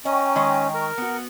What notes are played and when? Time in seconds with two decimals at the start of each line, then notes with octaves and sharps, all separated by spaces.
0.05 C#4 D#5 G5 A#5 C#6
0.35 D#3 G#3 D#5
0.74 A#4
0.98 B3 F#4